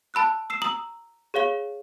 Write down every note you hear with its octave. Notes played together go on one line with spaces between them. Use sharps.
A5 B5 E6 F#6
E6 C7 E7
A#5 D#6 E6 F#7
G#4 C#5 F5 G7